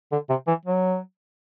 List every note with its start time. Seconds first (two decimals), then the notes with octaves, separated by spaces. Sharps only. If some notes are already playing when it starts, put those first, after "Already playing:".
0.12 D3
0.29 C3
0.47 E3
0.66 F#3